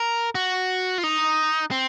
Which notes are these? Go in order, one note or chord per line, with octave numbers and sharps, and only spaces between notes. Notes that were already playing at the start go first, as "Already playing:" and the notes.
Already playing: A#4
F#4
F4
D#4
C4